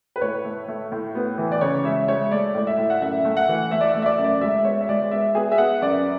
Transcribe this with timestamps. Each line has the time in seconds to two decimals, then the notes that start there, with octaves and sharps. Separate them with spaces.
0.16 B4
0.21 A2 C#5
0.45 A3
0.68 A3
0.92 A2
1.15 B3
1.38 E3
1.52 D5
1.61 C#3 C#5
1.84 G#3 E5
2.07 G#3 C#5
2.31 A3 D5
2.55 A2 D5
2.67 E5
2.78 A2
2.90 F#5
3.01 F#2 E5
3.25 A3
3.37 F#5
3.49 E3
3.71 A3 E5
3.81 D5
3.88 E5
3.95 A3
4.02 E5
4.06 D5
4.19 F#2
4.24 D5
4.41 G#3 E5
4.65 B3 C#5
4.81 E5
4.89 G#3 D5
5.11 B3 E5
5.35 B3 G#4
5.52 E5
5.58 B3 F#5
5.82 F#2 D5